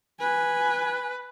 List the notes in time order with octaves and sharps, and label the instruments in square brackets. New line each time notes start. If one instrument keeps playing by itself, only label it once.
[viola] B4 [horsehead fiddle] G#5